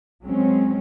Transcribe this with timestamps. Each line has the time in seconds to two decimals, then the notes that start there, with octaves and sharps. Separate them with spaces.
0.25 F#3 G#3 C4 C#4